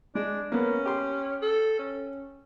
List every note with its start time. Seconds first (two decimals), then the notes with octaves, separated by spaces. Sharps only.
0.15 G#3 D4
0.52 A#3 B3 C#4
0.86 G4 C6
1.42 A4
1.79 C#4